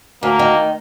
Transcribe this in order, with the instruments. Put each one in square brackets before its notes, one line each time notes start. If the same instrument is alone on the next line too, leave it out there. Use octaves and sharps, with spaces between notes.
[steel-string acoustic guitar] D2 [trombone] A#3
[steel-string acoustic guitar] D#3